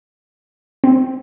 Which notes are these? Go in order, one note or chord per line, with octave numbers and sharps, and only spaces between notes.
C4